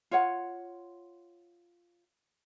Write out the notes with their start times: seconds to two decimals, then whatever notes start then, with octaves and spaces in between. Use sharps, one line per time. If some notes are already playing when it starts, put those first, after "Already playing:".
0.11 F4 C#5 F#5